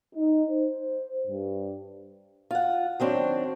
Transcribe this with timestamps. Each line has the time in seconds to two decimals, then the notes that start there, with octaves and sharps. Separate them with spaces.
0.15 D#4
0.50 C5
1.28 G2
2.51 F4 F#5
3.00 D#3 F#3 C4 D4